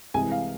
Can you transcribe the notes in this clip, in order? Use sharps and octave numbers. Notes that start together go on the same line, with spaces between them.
C2 C3 E3 G#3 G#5
F5